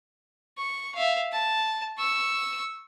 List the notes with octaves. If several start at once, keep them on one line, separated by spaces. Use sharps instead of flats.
C#6
E5 F5
A5
C#6 E6